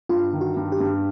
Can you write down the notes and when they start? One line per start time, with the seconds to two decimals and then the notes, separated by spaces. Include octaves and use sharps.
0.09 G2 F4
0.33 D#3
0.41 F#4
0.57 G2
0.72 G4
0.80 G2